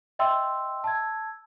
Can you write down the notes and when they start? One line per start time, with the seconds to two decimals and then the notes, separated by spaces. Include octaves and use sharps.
0.19 D#5 E5 G5 C6 E6
0.84 A5 E6 G#6